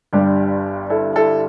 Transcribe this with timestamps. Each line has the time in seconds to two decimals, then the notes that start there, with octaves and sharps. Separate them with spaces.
0.13 G1 G2 G3 D4 G4
0.90 E4 A4
1.16 E4 A4